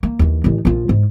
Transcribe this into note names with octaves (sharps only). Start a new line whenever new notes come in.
A#3
D#2 E3
A1 D#3
A#1 F4
G#2